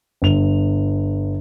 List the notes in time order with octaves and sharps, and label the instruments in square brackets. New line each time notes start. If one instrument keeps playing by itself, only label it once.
[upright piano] G1 F7